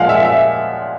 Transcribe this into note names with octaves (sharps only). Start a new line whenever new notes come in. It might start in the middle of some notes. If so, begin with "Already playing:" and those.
Already playing: A#2 F3 G#3 F5 F#5
E5
E5